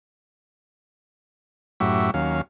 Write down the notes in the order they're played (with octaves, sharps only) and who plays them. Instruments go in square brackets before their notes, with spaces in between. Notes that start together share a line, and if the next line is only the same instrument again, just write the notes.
[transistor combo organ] F#2 A2 F#4 G4 E5
D#2 F#3 C#4 F5